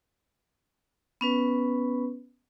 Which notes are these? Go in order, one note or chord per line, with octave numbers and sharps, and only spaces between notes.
B3 C#4 B4